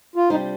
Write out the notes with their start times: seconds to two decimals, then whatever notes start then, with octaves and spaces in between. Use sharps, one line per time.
0.16 F4
0.29 C3 G3 D4 D#4 F4 C5